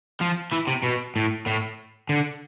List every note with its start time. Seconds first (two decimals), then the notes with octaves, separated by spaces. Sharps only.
0.21 F3
0.52 E3
0.69 C3
0.84 B2
1.16 A2
1.46 A2
2.09 D3